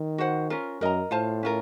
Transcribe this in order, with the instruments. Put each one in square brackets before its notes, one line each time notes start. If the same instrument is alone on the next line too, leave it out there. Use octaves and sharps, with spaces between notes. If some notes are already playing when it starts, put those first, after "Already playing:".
Already playing: [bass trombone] D#3
[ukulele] F#4 C5 F#5
C#4 F4 A#4
[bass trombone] F#2 [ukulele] A#4 D#5 A#5
[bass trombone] A2 [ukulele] F4 C5 F5 A5
[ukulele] C#4 F4 A#4